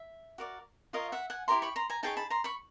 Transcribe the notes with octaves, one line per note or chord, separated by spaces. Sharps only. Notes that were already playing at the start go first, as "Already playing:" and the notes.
Already playing: E5
F#4 A#4 D5
F4 A#4 C#5 D#5 F5
E5 F#5
F#5 G#5
E4 G4 A#4 A#5 C6
B5 C#6
A#5 C6
G#5 A#5
D#4 G#4 C#5 G5 A5
A5 B5
A#5 C6
B5 C#6